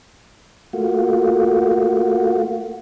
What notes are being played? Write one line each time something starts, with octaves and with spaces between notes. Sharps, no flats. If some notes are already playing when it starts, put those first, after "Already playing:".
A3 A#3 F4 F#4